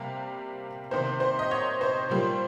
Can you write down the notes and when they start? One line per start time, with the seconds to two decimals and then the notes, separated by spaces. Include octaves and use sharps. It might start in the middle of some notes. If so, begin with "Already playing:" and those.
Already playing: C3 G3 A#3 F5
0.91 C3 D#3 A#3 C5
1.20 C5
1.39 D#5
1.51 C#5
1.81 C5
2.10 A#2 G3 A#3